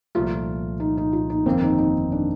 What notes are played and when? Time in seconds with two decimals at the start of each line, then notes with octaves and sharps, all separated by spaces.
0.15 C2 A#2 F3 A3 F4
0.80 D#4
0.97 D#4
1.13 F4
1.30 D#4
1.45 G1 F2 D#3 A#3 C4
1.62 D#4
1.78 D#4
2.12 D4